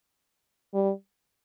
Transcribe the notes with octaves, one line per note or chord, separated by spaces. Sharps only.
G3